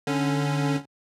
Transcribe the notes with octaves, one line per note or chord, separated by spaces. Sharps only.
D3 C#4